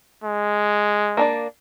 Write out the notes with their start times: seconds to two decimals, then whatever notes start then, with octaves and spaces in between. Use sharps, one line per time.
0.24 G#3
1.17 A#3 D4 D5